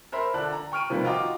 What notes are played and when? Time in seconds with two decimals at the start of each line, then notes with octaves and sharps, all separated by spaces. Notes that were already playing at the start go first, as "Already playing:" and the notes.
0.12 A#4 C5 E5 B5
0.34 D3 D4 A5 F#6
0.52 A#5
0.72 G5 C#6 F6 D7 D#7
0.90 C3 D#3 F3 G3 A#3 B4
1.04 F4 F#4 D#5 G5 A#5 D6